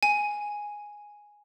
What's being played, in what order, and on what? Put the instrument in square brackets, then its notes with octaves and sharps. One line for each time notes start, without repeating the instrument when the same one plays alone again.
[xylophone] G#5